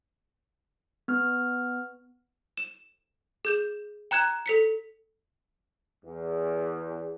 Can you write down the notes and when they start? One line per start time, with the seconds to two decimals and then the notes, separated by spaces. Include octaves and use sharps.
1.08 B3 F6
2.58 E7
3.45 G#4 G6 E7
4.11 G5 A#5 F#6 G#6 E7
4.46 A4 B6 C#7
6.05 E2